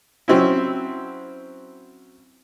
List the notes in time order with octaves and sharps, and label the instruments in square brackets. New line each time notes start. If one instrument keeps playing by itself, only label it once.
[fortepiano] F#3 C4 C#4 E4